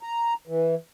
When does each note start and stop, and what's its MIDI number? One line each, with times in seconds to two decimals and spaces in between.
0.03 0.34 82
0.47 0.75 52